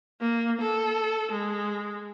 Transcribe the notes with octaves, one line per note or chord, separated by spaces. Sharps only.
A#3
A4
G#3